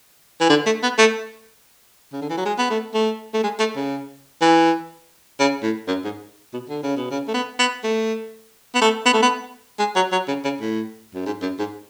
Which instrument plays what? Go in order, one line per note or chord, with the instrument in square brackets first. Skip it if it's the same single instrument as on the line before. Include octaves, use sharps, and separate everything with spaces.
[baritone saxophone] E3
D3
A3
B3
A3
C#3
D3
E3
F#3
G#3
B3
A3
A3
A3
G#3
A3
C#3
E3
C#3
A2
F#2
G#2
B2
D3
C#3
B2
C#3
A3
B3
B3
A3
B3
A3
B3
A3
B3
G#3
F#3
F#3
C#3
C#3
A2
F#2
G#2
F#2
G#2